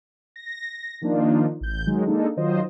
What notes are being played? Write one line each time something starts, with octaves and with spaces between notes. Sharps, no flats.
A#6
D#3 F3 A#3 D4 D#4 F4
A1 G6
D#3 F#3 G#3
G#3 A#3 D4 D#4 A4
D#3 F#3 F4 C5 D#5